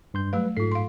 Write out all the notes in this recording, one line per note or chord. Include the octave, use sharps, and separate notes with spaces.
G2 C6 G6
F#3 G3 A3 B4 F5
G#2 F4 A4 B6 C7
F5 C6